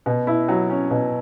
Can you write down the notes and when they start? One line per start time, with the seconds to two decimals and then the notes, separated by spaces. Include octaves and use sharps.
0.06 B2
0.27 E4
0.49 F#3
0.70 C#4
0.91 B2